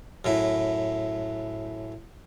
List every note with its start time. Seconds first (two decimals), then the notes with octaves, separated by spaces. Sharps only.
0.25 F#2 A2 E4